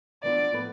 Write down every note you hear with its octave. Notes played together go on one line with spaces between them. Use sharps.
E3 B3 D4 F4 D5
A2 F3 B3 E4 B4